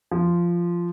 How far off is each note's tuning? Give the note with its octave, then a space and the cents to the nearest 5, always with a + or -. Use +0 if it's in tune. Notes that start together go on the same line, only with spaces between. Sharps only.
F3 -10